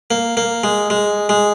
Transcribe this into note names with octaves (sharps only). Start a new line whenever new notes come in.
A#3
A#3
G#3
G#3
G#3